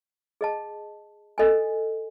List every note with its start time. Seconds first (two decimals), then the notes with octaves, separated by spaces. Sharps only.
0.41 G#4 D#5 A5
1.38 A4 D#5 G#5